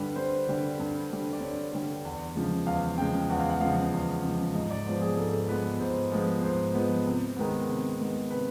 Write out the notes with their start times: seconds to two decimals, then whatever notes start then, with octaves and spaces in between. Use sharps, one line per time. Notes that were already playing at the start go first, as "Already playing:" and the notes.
Already playing: G2 D3 G3 B4
0.16 G2 C5
0.47 D3 G3
0.79 G2
1.11 D3 G3
1.33 D5
1.41 G2 C#5
1.72 D3 G3
2.05 E2
2.35 C#3 F3 G#3
2.66 E2 F5
2.98 C#3 F3 G#3 G5
3.29 E2 F#5
3.39 F5
3.50 F#5
3.61 C#3 F3 G#3 F5
3.92 E2
4.23 C#3 F3 G#3
4.54 G#2 D#5
4.70 D5
4.86 F3 G#3 B3 C5
5.02 G#4
5.17 G#2 A4
5.48 F3 G#3 B3 B4
5.80 G#2 C5
6.12 F3 G#3 B3
6.43 G#2 C5
6.74 F3 G#3 B3
7.06 C3
7.37 D#3 G#3 B3
7.68 C3
7.99 D#3 G#3 B3
8.30 C3 B4